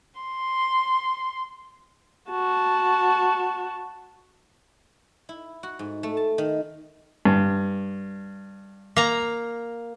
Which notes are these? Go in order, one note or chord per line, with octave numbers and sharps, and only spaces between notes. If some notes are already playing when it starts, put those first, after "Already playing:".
C6
F#4 A5
E4
F#4
G#2
A3
A5
D#3
G2
A#3 A#5